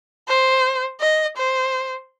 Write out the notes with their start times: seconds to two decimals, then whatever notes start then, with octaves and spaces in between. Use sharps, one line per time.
0.28 C5
1.00 D#5
1.37 C5